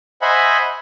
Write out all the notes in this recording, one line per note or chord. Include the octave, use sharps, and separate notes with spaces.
C5 D#5 E5 F#5 G#5 B5